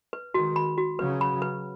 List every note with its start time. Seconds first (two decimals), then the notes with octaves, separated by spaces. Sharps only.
0.13 B4
0.34 D#3 G#3 F#4
0.56 B5
0.78 F#4
0.99 C#3 F#3 B4
1.21 B5
1.42 B4